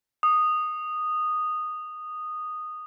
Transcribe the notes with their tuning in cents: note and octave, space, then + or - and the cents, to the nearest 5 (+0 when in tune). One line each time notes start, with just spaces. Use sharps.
D#6 -10